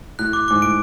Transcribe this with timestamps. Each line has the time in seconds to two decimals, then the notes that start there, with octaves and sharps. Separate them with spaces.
0.19 A2 F#6
0.33 D6
0.48 G#2 D6
0.62 A2 D7